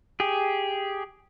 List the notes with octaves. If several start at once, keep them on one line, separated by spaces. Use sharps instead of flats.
G4 G#4